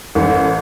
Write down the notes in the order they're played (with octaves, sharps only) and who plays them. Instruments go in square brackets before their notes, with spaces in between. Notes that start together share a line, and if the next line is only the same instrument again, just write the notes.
[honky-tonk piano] A1